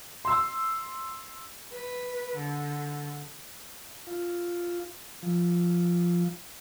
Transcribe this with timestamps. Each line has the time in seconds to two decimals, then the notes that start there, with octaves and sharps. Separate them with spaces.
0.25 C6 E6
1.72 B4
2.36 D3
4.07 F4
5.23 F3